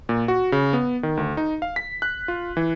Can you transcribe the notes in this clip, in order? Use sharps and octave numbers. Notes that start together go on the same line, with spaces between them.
A#2
F#4
C#3
B3
D#3
D2
D#4
F5
B6
F#6
F4
E3